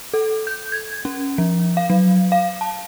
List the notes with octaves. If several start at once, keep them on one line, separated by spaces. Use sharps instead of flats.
A4
G6
G#6
C#4
F3
F5
F#3
F5
A5